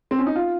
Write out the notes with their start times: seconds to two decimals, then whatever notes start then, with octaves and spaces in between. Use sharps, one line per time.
0.11 C4
0.19 C#4
0.26 D#4
0.36 F4